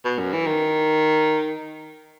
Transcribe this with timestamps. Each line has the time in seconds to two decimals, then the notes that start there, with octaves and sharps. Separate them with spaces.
0.05 B2
0.19 F#2
0.33 E3
0.47 D#3